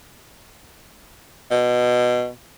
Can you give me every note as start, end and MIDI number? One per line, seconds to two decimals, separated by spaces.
1.51 2.28 47